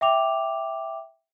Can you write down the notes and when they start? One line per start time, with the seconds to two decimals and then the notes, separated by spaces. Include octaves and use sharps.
0.01 E5 G5 D6 F7